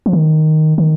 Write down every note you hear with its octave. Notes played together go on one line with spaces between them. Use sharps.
F3
D#3
D#3